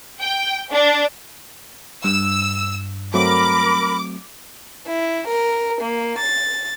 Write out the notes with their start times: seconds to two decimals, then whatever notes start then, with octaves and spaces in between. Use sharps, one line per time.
0.21 G5
0.72 D4
2.04 G2 E6
3.14 F#3 A3 C4 A#4 B5 D6
4.87 E4
5.28 A#4
5.81 A#3
6.18 A6